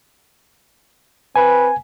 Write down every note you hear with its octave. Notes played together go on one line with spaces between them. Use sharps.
C4 B4 G#5